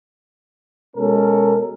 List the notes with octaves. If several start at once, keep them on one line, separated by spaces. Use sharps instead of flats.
B2 G#3 C#4 A4 A#4